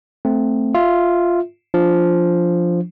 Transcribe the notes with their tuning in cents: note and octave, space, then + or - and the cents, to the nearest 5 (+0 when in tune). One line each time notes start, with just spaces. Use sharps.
A3 +0 C4 +0
F4 +0 E5 +0
F3 +0 D4 +0